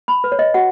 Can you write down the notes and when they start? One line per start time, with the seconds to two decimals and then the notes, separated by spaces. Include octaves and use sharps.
0.08 B5
0.24 B4
0.32 C#5
0.39 D#5
0.54 F#4 F#5